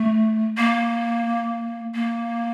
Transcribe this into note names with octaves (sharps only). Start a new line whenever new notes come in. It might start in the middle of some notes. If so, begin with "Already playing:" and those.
Already playing: A3
A#3
A#3